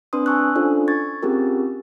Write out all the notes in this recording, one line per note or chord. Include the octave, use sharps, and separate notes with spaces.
C4 D4 B4 C6 D#6
G#5 A5 C#6 E6 F#6
C#4 D4 F4 A4 C5
C#6 G#6 A6
C4 C#4 F4 G4 G#4 A#4